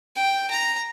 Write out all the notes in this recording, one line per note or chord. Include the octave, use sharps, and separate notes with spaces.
G5
A#5